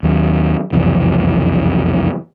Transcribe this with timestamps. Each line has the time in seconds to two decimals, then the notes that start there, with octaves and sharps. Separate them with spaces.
0.03 D#2 F#3
0.72 F#1 C2 F2 E3